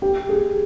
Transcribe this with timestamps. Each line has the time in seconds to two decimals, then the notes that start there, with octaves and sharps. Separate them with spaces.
0.02 G4
0.29 G#4